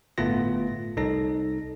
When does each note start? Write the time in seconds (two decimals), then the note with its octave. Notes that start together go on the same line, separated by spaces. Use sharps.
0.18 G1 A2 A3 B3 F4 A#6
0.97 C2 D#4 A4 A#6